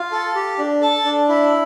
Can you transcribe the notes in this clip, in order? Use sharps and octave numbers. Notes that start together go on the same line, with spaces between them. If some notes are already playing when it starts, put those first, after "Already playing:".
Already playing: F4
A4
G4
D4
A4 A5
D4
E4